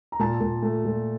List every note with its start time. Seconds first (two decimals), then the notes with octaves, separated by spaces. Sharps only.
0.12 A#5
0.19 A#2 A5
0.41 A#2
0.62 A3
0.85 A#2